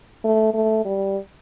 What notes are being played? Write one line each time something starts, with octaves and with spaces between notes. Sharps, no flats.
A3
A3
G3